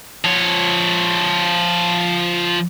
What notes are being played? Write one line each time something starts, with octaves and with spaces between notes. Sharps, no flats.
F3 C#5